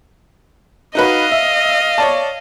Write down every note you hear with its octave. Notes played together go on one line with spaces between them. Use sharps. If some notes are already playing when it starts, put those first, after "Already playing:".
D#4 F#4 B4 D#5 F5
E5
C#5 D5 A5